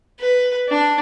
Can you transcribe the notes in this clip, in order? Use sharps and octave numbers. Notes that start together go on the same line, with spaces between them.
B4
D4